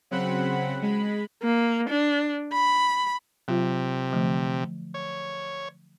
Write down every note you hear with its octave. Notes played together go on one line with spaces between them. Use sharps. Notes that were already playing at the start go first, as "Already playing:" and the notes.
C#3 F#3 C4 F#5 B5
G#3 B5
A#3
D4
B5
C3 F#3 F4
D3 F3 A3
C#5